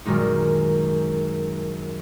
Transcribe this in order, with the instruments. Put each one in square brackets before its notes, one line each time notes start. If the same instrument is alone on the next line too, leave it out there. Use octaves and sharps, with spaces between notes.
[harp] F#2 A#2 D#3 G#3 D#4